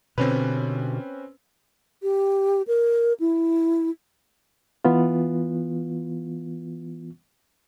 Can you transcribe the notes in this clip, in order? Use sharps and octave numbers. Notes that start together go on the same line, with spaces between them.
B2 D3 C4 C#4 B4
G4
A#4
E4
E3 B3 F4